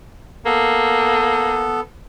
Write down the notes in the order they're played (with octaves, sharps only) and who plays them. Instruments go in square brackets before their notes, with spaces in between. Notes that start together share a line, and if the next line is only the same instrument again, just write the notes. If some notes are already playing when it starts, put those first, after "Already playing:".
[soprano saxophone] A#3 [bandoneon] B3 A4